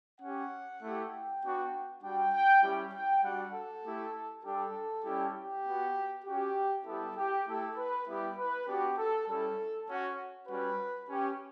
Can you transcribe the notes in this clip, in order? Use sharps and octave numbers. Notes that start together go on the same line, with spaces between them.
C#4 G4 F#5
A3 E4 G4
G5
B3 D4 F#4
G3 D4 F#4 G5
G5
G3 C#4 E4 G4
G5
G3 D4 F#4 F#5
A4
A3 E4 G4
G3 D4 G4 A4
G3 C#4 E4 G4
G4
B3 F#4
C#4 F#4 G4
G3 B3 E4 G4 A4
G4
A3 E4 G4 A4
B4
G3 B3 E4 G4 B4
B4
B3 D4 F#4 G4
A4
G3 C#4 E4 A4
C#4 F#4
G3 C#4 F#4 B4
C#4 G4